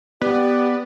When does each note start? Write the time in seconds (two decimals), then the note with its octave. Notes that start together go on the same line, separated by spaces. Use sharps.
0.22 B3 G4 D5